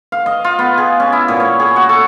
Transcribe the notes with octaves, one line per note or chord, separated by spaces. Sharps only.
F5
D#5
F4
B3
G#4
C#4
E4
A#2
C#5
G#4
F#4
A4